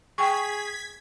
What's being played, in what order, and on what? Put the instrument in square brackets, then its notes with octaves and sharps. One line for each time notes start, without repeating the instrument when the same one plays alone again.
[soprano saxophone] G#4 [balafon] G5 C#6 [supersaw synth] G#6 B6